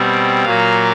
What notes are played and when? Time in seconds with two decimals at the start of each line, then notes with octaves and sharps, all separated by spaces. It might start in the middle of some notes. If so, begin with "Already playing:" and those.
Already playing: B2 G3 C4
0.44 A#2 F#3 A#3 F5